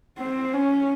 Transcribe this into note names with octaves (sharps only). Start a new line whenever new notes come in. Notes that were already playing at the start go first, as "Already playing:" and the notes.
C4
C#4